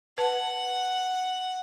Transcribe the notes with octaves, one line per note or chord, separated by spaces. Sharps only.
B4 F#5 A5